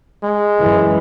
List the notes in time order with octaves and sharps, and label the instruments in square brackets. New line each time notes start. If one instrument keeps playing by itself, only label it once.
[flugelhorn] G#3
[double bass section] F#2 E3